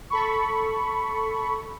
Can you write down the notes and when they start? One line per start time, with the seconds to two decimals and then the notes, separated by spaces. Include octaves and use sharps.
0.10 A4 B5 C#6